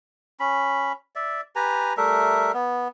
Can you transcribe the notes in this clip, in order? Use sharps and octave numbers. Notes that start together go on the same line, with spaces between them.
C#4 B5
D5 E5
G4 B4 G#5 A#5
G3 A3 A#4 E5
B3